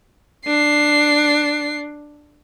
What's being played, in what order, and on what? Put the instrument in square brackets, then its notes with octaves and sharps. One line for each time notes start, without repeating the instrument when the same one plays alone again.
[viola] D4 [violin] C7